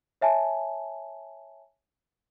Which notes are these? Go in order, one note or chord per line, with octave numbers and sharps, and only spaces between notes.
C#5 E5 G#5 A5